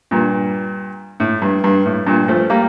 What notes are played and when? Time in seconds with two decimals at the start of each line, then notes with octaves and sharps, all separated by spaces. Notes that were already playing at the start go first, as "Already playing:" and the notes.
0.11 G2 A#2
1.20 A2
1.42 G2
1.64 G2
1.85 A2
2.07 G2 A#2
2.28 F3 A3
2.50 G3 A#3